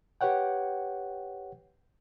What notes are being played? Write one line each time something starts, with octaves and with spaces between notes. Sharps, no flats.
G4 B4 C#5 F#5 G5